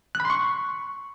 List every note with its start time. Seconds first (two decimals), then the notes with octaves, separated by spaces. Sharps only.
0.15 F#6
0.20 B5
0.25 C6
0.30 C#6